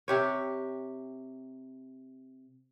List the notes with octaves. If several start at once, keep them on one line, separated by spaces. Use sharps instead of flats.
C3 G4 C#5